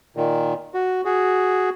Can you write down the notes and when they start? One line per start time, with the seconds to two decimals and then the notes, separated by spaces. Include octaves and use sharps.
0.17 A#2 D#3
0.74 F#4
1.05 F#4 G#4